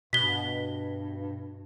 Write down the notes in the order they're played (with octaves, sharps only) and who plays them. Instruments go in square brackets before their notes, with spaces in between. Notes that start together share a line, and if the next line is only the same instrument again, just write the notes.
[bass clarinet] G2 [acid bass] B2 [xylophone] B6 G7